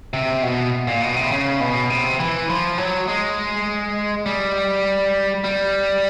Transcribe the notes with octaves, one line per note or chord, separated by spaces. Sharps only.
C3
B2
A#2
B2
C3
C#3
B2
C3
E3
F3
F#3
G#3
G3
G3